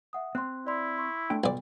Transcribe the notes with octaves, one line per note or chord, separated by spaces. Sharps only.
E5 F#5 D#6
C4 C6 F#6
E4 D5 C6
C6 C#6 E6
A3 D4 G5
B1 B2 D5